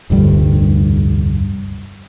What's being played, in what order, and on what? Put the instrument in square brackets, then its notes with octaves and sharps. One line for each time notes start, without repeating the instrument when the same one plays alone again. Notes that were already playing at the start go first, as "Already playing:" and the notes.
[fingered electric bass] F1 D2 G2 G3